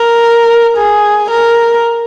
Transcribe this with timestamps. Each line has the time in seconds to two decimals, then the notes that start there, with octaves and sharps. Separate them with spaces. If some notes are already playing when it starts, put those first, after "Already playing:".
Already playing: A#4
0.77 G#4
1.30 A#4